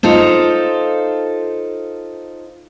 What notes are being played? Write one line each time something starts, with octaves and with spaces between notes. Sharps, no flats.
D#4 F4 A4 C5